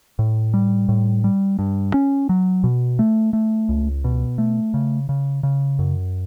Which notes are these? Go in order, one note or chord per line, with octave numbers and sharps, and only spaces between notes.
A2
G3
A2
G3
G2
C#4
F#3
B2
A3
A3
C#2
B2
A3
C#3
C#3
C#3
F#2